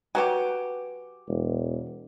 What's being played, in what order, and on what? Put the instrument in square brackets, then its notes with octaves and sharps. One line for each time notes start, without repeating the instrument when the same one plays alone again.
[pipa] F#3 F#4 G4 [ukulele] B4 G#5
[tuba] E1